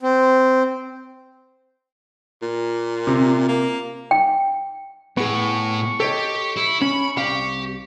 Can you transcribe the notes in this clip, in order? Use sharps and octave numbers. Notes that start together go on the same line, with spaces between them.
C4
A#2
C3
A#3
G5
A2 B3 G#4 C#6
G4 A4 C#5 D#5
E4
C#4 B5
C2 G4 F5